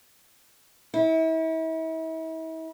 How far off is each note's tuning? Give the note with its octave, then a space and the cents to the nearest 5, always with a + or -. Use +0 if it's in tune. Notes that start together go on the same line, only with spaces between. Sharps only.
E4 -40